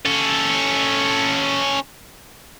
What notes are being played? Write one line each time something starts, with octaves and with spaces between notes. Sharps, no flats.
C#4 A4